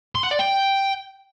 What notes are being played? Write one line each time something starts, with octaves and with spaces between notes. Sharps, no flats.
C6
F#5
D5
G5